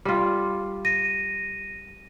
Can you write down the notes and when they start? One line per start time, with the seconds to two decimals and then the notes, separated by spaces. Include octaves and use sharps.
0.05 G3 F4
0.85 A#6 D#7